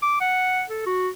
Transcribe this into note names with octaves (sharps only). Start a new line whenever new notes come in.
D6
F#5
A4
F#4